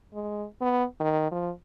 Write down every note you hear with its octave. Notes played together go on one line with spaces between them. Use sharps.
G#3
B3
D#3
F3